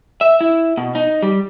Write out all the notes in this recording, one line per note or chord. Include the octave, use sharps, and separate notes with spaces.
E5
E4
B2
D#4
G3